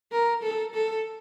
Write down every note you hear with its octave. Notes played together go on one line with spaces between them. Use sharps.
A#4
A4
A4